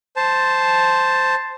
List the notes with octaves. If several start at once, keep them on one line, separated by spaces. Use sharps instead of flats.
C5 A5